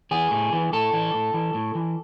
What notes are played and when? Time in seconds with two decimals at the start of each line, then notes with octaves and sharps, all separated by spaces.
0.11 E3 G#4
0.31 A2
0.53 E3
0.73 A2 A4
0.93 E3
1.14 A2
1.34 E3
1.54 A2
1.75 E3